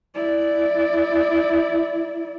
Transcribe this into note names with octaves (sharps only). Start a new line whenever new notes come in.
E4 D5